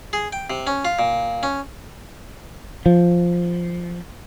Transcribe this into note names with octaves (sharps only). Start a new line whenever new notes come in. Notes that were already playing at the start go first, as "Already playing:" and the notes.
G#4
G5
C3
C#4
F4
A#2
C#4
F3